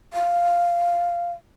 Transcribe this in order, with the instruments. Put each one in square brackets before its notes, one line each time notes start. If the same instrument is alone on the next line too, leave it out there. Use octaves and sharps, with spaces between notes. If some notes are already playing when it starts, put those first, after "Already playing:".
[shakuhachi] F5